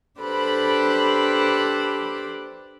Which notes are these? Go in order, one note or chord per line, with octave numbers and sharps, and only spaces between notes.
D4 G4 A4 B4 C5 B5